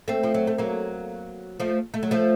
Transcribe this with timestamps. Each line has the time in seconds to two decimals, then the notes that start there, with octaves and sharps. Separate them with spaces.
0.08 A3 C4
0.23 F3
0.34 F#3
0.47 A3
0.58 F#3 A#3
1.60 F3 A3
1.94 A3
2.03 F#3
2.11 F3 A3